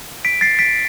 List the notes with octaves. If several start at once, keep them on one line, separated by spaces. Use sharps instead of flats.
B6 D7
A6 C7
B6 D7